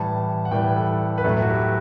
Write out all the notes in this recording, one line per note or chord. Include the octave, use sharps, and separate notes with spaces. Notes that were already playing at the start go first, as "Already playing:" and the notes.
Already playing: A2 E3 G3 A5
F#5
A2 E3 G3 G5
A4
B4
A2 F#3 A3 A4
F#4
G4